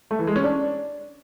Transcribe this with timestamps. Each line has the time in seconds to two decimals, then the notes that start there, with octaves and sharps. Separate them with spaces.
0.11 A3
0.19 E3
0.27 G#3
0.36 C#4
0.44 D4